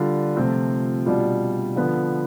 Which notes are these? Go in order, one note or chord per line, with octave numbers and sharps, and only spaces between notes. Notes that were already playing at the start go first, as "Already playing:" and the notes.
Already playing: D3 G3 D4 F4
C3 F3 A3 C4 F4
B2 G3 D4 F4
D3 F3 B3